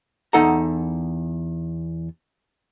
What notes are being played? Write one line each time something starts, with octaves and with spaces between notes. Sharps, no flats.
E2 D#4 A4 F#5 A#5